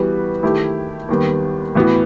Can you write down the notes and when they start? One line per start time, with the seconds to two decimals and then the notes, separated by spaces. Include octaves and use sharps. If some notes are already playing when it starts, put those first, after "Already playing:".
Already playing: E3 G3 B3 F#4 B4
0.43 D#3 A3 E4 G4
1.09 D#2 D#3 G3 B3
1.75 A2 E3 B3 F#4